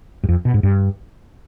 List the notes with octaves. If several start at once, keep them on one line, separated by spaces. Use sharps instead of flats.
G2
F2
B2
G#2
G2